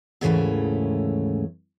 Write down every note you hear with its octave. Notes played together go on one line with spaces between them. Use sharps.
D#2 G#2 C#3 E3 A3 C#4